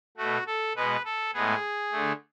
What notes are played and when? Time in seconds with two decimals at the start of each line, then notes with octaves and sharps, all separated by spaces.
0.17 B2 A3 F#4
0.47 A4
0.76 B2 G#3 B3 B4
1.05 A4
1.34 A2 G#3 B3 G#4
1.92 D3 A3